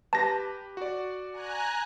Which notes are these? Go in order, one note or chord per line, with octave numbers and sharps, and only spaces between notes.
G4 B4 A5 A#6
F#4 D5
G#5 A#5 F#6